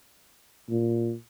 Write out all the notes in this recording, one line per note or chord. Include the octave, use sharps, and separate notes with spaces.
A#2